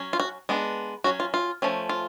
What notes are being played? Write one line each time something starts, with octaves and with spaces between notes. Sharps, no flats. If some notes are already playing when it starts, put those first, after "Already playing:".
Already playing: F#3 C#4
F4
F#4
G#3 B3 D4
F#3 C#4 F#4
F4
F4
F3 A3 C#4
F4